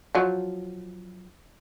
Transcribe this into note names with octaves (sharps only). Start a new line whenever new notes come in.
F3 F#3